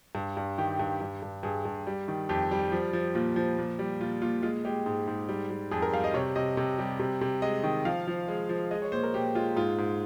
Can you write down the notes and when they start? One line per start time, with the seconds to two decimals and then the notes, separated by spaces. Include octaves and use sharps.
0.15 G2
0.37 G2
0.58 D#3 G4
0.79 G2
1.01 G2
1.23 G2
1.43 G2 G#4
1.65 G2
1.87 G3
2.08 D#3
2.29 F2 G4
2.51 G3
2.72 F3
2.93 F3
3.15 A#2 F4
3.36 F3
3.58 A#2
3.79 G3
4.00 A#2 F4
4.22 A#2 F4
4.43 G#3 F4
4.65 G#3 G4
4.86 G#2
5.07 G#2
5.29 G3
5.50 G3
5.71 F2 G#4
5.82 A#4
5.92 G3 F5
6.04 D#5
6.14 C3 C#5
6.35 C3 D#5
6.57 C3
6.78 G3
7.00 C3
7.21 C3
7.42 G#3 D#5
7.63 D#3
7.85 F3 F5
8.07 F3
8.28 G#3
8.49 F3
8.71 G#3 D#5
8.82 C#5
8.92 A#2 C5
9.03 A#4
9.14 A#2 G4
9.35 G#3 F4
9.56 G#2 F4
9.78 G#2